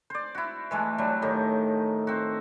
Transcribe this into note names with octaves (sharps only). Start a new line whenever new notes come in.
C5 D5
E4 F#4
E3 G#3 A3
F#3 G3 D4
A2 D#3 D#4 G4
C4 F#4